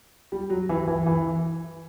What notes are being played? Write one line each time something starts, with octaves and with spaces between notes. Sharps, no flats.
G3
F#3
E3
E3
E3